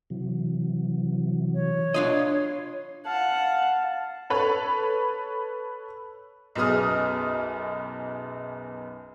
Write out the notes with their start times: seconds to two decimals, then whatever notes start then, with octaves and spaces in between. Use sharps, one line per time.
0.10 C3 E3 F#3
1.54 C#5
1.94 D4 F4 D#5 C6
3.06 F5 F#5 A5
4.30 A4 B4 C#5 B5
6.55 B1 F#2 B3 G#4 D#6 F6